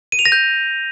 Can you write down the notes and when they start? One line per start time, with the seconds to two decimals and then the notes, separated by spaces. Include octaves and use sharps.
0.12 D#7
0.19 F7
0.25 A#6
0.32 G6